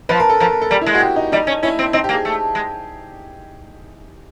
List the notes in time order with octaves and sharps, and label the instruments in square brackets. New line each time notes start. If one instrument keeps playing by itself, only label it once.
[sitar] F3 [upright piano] B4
[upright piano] A#4
A4
[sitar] F3 [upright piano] A#4
[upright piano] A4
[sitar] G3 [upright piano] A#4
[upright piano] E4
[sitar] G#3
[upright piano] F#4
G4
D#4
[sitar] G3 [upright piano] D#4
[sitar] C#4
[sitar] C#4 [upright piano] E4
[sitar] C4
[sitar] C4 [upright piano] D#4
[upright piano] G4
[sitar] A#3
[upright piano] G#4
[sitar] A3
G#3